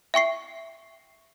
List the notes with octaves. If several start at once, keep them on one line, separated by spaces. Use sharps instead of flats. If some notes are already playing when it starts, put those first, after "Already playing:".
E5 G5 C#6 C7